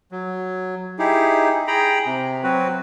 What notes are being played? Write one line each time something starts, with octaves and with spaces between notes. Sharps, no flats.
F#3
D#4 E4 G4 G#4
G#4 G5 A#5 B5
C3
F#3 C4 F#4 B4